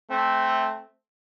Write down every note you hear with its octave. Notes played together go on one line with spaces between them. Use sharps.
A3 C4